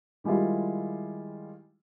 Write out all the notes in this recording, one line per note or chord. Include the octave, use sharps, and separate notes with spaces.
D#3 G3 G#3 E4 F4